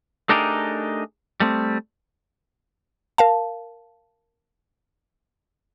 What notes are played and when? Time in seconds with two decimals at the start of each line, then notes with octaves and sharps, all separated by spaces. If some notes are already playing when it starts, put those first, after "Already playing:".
0.29 A3 D4 D#4 G4 G#4 A#4
1.40 G3 A3 C4
3.18 A#4 F5 A5